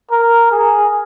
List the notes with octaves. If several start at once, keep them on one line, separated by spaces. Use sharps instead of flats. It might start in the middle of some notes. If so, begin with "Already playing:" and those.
A#4
G#4